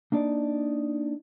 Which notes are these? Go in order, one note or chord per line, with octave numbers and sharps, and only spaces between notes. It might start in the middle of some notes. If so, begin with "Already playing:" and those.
A#3 D4 D#4 D5